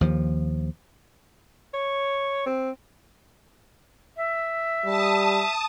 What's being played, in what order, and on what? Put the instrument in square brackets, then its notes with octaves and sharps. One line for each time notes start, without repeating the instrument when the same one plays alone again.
[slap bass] D#2 F3
[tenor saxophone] C#5
C4
[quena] E5
[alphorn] G3 [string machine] A5 D#6